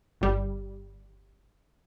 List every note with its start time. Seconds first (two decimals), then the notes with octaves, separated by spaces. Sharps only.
0.21 G1 G3